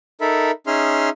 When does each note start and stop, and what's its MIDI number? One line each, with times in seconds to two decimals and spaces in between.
0.21 0.51 63
0.21 0.51 69
0.21 0.51 70
0.21 0.51 76
0.21 0.51 83
0.67 1.09 61
0.67 1.09 63
0.67 1.09 68
0.67 1.09 76
0.67 1.09 84
0.67 1.09 89